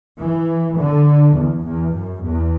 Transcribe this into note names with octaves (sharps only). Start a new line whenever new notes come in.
E3
D3
E2
E2
F#2
E2